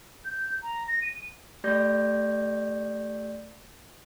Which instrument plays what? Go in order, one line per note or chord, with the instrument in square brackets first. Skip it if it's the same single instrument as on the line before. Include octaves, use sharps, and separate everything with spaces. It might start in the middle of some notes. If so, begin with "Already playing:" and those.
[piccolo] G6
A#5
A#6
D#7
[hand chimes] A3 G4 D5 G6 A#6